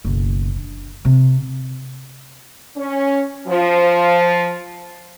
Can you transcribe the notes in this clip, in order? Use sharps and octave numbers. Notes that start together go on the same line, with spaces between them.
F#1 B1
D3
C3 C4
C#4
F3